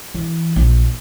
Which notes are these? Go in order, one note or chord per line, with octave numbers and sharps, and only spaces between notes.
E3
A#1